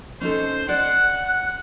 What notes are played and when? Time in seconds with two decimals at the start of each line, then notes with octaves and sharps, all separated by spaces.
0.21 C#4 D#4 A4 C5
0.69 D5 F#5 F#6